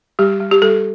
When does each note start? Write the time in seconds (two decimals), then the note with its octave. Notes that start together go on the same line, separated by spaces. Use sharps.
0.19 G3 G4
0.40 G3
0.51 G4
0.62 G3 A4